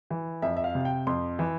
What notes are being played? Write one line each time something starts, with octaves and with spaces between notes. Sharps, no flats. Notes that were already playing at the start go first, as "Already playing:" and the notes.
E3
F2 E5
E5
F5
C3
G5
F2 C6
E3